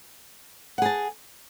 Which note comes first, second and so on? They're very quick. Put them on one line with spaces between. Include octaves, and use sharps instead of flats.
F#5 G#4 A5